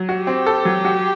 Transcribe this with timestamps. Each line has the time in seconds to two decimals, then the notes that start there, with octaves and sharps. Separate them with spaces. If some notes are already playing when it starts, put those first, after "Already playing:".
Already playing: F#3
0.09 F#4
0.17 G4
0.27 C4
0.46 A4
0.65 F#3
0.85 F#4